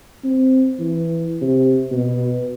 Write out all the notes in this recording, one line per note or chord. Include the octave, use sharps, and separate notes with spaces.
C4
E3
C3
B2